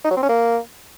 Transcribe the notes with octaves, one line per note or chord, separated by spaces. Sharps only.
D#4
F#3
C4
C#4
A#3